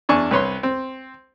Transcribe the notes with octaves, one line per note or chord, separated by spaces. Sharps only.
E2 D4 G#5 C#6
C2 B4 C#5 C6
C4